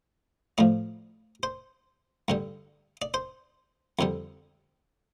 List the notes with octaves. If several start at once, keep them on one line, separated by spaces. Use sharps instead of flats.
A2 F3 D5
C5
G2 D3 G3
D5
C5
F2 D3 G3